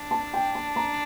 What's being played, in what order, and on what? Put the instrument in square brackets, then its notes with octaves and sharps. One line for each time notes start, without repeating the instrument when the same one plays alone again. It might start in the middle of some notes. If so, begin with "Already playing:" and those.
Already playing: [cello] D4
[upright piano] A5
G5
A5
A#5